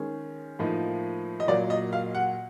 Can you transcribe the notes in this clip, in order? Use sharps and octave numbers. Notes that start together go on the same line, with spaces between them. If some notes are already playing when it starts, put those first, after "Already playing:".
Already playing: D#3 G#3 C#4
A2 F3 A#3 D#4
D#5
A#2 F#3 A#3 D5
D#5
F5
F#5